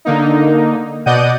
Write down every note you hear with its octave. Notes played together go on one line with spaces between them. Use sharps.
D3 A#3 D#4
B2 D5 D#5 F#5 G6 D#7